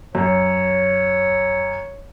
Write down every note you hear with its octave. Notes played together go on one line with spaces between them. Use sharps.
F#2 C#5